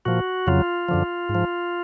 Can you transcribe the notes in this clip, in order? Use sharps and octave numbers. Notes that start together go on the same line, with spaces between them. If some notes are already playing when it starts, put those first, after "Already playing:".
A#2 F3 F#4
F2 C#3 F#3 F4
F#2 D3 F3
G#2
F3